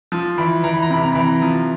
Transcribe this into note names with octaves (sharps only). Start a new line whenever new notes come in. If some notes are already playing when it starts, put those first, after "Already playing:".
F3
E3 B5
E3 A#5
B5
A#5
C3 B5
A#5
E3 B5
A#5
F3